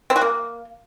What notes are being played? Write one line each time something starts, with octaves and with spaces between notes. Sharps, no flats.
C4
F#4
A#3